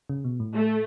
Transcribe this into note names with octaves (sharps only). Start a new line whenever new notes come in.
C#3
B2
A2
A3